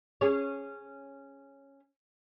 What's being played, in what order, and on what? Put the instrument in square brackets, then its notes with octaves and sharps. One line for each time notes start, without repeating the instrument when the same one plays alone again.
[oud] C#4 G#4 C#5